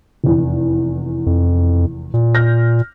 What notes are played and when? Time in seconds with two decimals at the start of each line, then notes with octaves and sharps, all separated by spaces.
0.24 F1 E2
1.26 F2
2.14 A#2
2.35 F6 G6 A#6